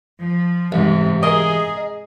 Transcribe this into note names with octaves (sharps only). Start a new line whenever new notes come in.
F3
A1 G#2 C3
G#4 A#4 D#5